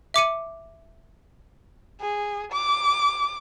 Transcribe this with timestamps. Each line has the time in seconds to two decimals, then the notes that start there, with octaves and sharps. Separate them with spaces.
0.14 E5 D6 C#7 D#7
2.01 G#4
2.52 D6